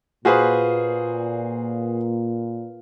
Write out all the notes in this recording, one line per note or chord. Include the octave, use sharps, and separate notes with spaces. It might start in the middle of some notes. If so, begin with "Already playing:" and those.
A#2 F4 F#4 G#4 B4 C5